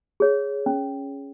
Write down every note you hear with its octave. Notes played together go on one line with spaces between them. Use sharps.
G#4 C#5
C#4